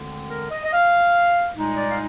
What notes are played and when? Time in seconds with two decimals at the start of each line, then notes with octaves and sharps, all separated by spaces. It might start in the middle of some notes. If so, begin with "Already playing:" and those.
Already playing: D2 D3 G#3 C4
0.30 A#4
0.51 D#5
0.64 D#5
0.73 F5
1.56 C2 A#2 G#3 D#4
1.77 D5
1.91 F5